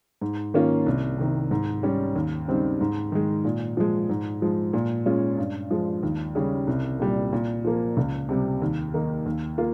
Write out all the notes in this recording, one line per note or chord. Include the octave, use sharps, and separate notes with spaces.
G#2
D#3 A#3 C#4 F4
C2
C3 D#3
G#2
G3 C#4
D#2
C#3 G3 C4 D#4
G#2
D#3 G#3
A#2
F3 G#3
G#2
F3 G#3
A#2
G#3 C#4 F4
G2
F3 G#3
D#2
C#3 G3 C#4 G#4
C2
A#2 G3
A#2
F3 A#3
C#2
C3 G3
D#2
D#3 A#3 D#4
D#2
A#3 F4